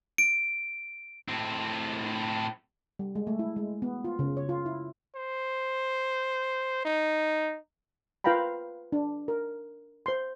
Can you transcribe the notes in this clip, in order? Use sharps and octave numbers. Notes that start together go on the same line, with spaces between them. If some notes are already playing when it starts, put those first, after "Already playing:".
D7
A2 C4
G3
G#3
A3
E4
G#3
B3
F4
C#3
C#5
F4
E4
C5
D#4
F4 B4 F5 G5 A#5 B5
D4
A#4
C5 C6